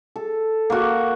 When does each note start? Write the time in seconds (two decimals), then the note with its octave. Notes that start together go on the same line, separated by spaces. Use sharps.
0.16 A4
0.70 A#3 F#4